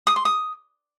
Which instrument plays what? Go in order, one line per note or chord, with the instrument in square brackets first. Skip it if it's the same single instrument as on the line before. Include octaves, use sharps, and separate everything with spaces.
[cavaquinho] D#6
C6
D#6